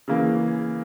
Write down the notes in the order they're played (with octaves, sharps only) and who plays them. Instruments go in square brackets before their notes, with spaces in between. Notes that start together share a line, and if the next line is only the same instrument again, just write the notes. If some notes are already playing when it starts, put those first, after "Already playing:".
[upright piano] C#3 E3 A#3